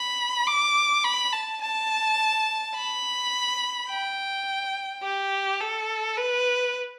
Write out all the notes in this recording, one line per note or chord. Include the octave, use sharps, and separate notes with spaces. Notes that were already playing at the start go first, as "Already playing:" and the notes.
Already playing: B5
D6
B5
A5
A5
B5
G5
G4
A4
B4